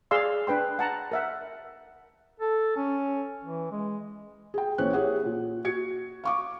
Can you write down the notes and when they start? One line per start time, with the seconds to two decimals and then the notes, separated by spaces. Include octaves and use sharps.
0.11 G#4 D5 F5 C6 E6
0.47 D4 B4 G5 C6
0.79 F#5 A5 A#5
1.12 A#4 E5 F#5
2.40 A4
2.77 C#4
3.45 E3
3.72 G#3
4.54 G#4 G5
4.78 A#1 E3 C4 C#4 C#5 F#6
4.93 E4 G4 G#4 C#5 F#5
5.25 A#2
5.65 F#4 G#6 C#7
6.24 F5 C#6 D6